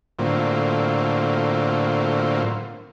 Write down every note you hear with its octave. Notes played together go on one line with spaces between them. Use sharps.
A2 D3 F#3 A#3 C4 F4